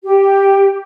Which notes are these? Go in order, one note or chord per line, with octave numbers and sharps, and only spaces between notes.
G4